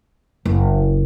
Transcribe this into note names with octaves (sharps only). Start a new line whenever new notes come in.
F#1